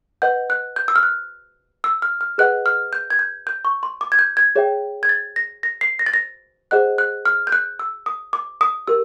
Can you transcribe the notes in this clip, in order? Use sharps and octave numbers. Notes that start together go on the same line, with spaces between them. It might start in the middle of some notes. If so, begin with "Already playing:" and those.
B4 D#5 F#5 G6
F#6
G6
E6
F6
F#6
E6
F6
F6
G#4 B4 D#5 F#5 F#6
F6
G6
G#6
G6
G6
C#6
C6
D6
G#6
G6
G#6
G#4 C#5 E5 G5
G#6
A6
A#6
A#6
C7
A#6
A6
A#6
G#4 C5 D#5 F#5 F#6
F#6
F6
G6
F#6
E6
D#6
D6
D#6
G4 A#4 E6